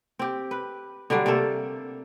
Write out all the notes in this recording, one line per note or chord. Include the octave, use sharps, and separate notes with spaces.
C4 G4
B4
D3 F#3 G3 D4
C3 A3 A#3 A4